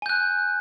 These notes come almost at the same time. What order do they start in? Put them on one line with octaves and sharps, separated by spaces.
G#5 G6 F#6